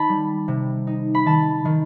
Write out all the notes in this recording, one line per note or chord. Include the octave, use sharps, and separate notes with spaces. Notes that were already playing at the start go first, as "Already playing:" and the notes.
Already playing: D#3 A5 B5
G3
C3
D#4
B5
D#3 A5
D#3